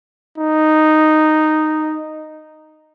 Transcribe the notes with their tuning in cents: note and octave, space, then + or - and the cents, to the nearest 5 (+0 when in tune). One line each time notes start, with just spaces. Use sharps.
D#4 -5